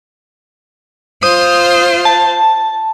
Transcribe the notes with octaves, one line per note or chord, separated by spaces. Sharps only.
F4 C5 D#6
A5